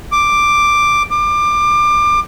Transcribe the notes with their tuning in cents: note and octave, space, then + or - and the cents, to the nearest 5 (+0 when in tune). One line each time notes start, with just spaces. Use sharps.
D6 +5
D6 +25